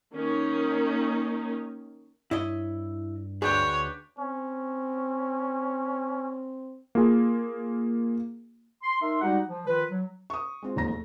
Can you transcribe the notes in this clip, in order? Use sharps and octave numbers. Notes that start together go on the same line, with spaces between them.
D#3 A#3 C#4 D#4
G2 E4 C#5 D#5
D2 D4 G#4 B4 C#5 G5
C4 C#4
A#3 F4 G#4
C6
D#4 A#4 E5 C6
G3 G#3 D#4 F#4 G4 F#5
F3
D#3 F3 F4 B4
F#3
C#6 D#6
G#3 C4 F4
E1 D#2 F3 A#5 A#6
A3